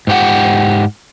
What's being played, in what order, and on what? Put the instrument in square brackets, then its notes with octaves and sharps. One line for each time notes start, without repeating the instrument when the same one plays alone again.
[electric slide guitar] G#2 G4 F#5